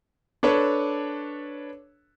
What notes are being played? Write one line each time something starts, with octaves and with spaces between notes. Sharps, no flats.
D4 A4 B4 C#5